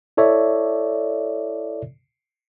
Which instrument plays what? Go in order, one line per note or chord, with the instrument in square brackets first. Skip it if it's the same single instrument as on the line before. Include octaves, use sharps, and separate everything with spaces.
[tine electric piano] E4 A4 C#5 D5 E5